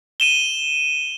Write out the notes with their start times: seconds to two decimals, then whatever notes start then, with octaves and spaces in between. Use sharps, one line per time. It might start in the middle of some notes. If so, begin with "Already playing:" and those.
0.20 D#7 E7 G7